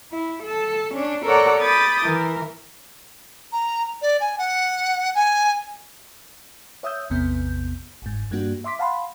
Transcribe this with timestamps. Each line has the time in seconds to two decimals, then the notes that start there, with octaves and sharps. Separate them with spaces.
0.12 E4
0.43 A4 A5
0.93 C#4 D4
1.24 A4 A#4 C#5 D5 F#5 A#5
1.60 B5 D6 D#6 G6 A6
2.03 E3 A#4
3.52 A#5
4.02 D5
4.20 G#5
4.38 F#5
5.15 G#5
6.83 C#5 E5 D#6 E6 G6
7.10 A1 E2 C3 B3 G6
8.02 G1 G#2
8.31 G2 G3 A#3 D4 F#4
8.64 E5 C6 D6 B6
8.79 F5 F#5 A5 B5 C6